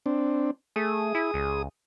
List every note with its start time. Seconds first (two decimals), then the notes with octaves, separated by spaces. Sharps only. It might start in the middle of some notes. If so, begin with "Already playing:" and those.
0.06 C4 D4
0.76 A3 G#4 D#6
1.15 E4
1.34 C#2